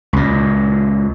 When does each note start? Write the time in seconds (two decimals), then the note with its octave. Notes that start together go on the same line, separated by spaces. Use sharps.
0.13 C#2 A#2